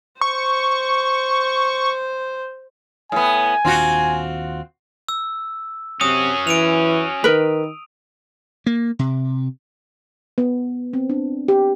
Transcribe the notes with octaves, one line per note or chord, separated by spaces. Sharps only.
C5 C#6
A2 B3 G#5
D#1 D#2 C4 D4 F4 F#4
E6
C3 C#4 F#4 D#6
E3 D7 D#7 F7
D#3 A#4 B4
A#3
C3
B3
C4
D4
G4